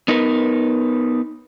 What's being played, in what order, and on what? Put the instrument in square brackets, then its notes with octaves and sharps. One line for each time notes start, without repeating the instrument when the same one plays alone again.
[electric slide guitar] B3 D#4 A#4 B4